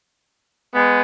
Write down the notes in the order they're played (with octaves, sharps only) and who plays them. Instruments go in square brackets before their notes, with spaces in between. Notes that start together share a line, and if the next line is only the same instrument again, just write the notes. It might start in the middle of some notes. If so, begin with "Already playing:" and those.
[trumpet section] G#3 B3